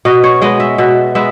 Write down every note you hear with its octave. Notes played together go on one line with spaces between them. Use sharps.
B2 D#5
C#5
G#3 B3 D#5
E5
B2 E5
G#3 B3 E5